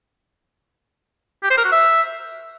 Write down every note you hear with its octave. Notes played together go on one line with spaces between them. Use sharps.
G4
C5
A#4
F#4
E5